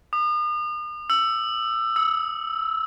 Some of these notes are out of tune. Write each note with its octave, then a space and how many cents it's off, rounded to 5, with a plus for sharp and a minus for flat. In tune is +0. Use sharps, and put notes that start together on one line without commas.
D#6 -40
E6 +15
E6 -25